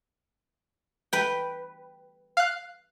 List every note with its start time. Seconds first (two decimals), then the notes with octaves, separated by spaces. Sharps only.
1.13 B4 G5
2.37 F5 F#6